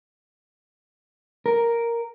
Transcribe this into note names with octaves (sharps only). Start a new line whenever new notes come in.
A#4